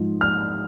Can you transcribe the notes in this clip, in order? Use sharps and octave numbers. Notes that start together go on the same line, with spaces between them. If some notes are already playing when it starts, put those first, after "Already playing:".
Already playing: G#2 F3
F6